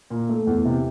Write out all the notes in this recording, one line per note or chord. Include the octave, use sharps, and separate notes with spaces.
A#2
A3
E2
C3